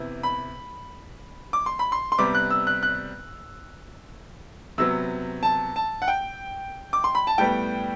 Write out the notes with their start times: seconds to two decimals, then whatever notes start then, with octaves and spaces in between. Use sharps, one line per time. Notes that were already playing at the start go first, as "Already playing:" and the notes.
Already playing: C3 E3 B3
0.23 B5
1.53 D6
1.66 C6
1.79 B5
1.92 C6
2.12 C6
2.18 C3 G3 B3 D6
2.35 F#6
2.51 E6
2.67 F#6
2.83 F#6
4.78 C3 F#3 B3 E6
5.43 A5
5.76 A5
6.02 F#5
6.08 G5
6.93 D6
7.04 C6
7.15 B5
7.27 A5
7.38 A2 G3 B3 G5